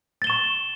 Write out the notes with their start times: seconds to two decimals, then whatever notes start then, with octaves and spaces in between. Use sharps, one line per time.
0.22 A6
0.24 G7
0.27 E7
0.30 C#6